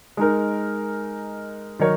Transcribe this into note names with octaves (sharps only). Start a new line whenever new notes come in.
G#3 D#4 A#4
D#3 F#3 D#4 A#4 C#5